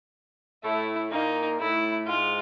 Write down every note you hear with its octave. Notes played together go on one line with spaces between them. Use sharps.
A2 A3 E4
A#2 A#3 D#4
A2 A3 E4
G#2 G#3 F4